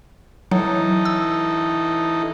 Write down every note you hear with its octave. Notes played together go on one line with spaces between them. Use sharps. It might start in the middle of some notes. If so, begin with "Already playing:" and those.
E3 F#3 D#4 A4
E6